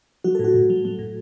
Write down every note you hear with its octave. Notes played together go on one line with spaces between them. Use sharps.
F#3 F#4
A2 A4
F#4
A2
F#3
F#3
A2